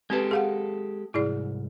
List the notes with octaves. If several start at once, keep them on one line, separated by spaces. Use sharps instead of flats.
G#3 C4 G4 A4 B4
G#4 F5 F#5
C2 G#2 E4 G#4 D5